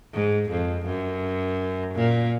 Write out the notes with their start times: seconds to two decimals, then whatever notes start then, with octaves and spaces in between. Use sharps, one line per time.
0.13 G#2
0.50 F2
0.86 F#2
1.95 A#2